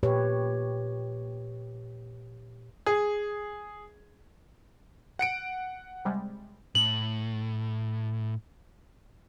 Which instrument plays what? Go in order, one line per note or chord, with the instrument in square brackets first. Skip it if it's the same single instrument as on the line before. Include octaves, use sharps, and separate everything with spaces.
[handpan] A#2 G4 B4 C#5
[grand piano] G#4
[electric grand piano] F#5 C#7 D7
[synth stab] C3 G3 G#3
[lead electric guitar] A2 [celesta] F#7